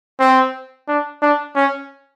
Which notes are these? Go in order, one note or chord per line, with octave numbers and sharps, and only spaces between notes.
C4
D4
D4
C#4